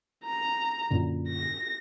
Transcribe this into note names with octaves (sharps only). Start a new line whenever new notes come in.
A#5
F#2 A#2 D3
A#6